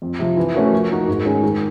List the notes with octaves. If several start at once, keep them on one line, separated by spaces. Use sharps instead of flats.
F2
C3 F3
E3
A3 C#4 F#4 A#4
F3
A#3 D#4 F#4
G#2
D#3 G#3 C#4
D#3